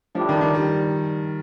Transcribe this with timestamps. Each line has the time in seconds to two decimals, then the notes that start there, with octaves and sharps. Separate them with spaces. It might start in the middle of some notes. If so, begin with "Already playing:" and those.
0.15 A2 F3 G3 D4
0.29 D#3
0.41 D#3
0.54 G3